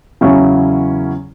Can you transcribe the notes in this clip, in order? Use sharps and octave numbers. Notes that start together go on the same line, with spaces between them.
E2 C#3 F#3 C#4 E4